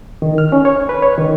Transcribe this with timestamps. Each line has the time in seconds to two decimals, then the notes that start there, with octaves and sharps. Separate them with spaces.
0.22 D#3
0.38 F6
0.52 C#4
0.65 C#5
0.89 B4
1.02 C#5
1.18 D#3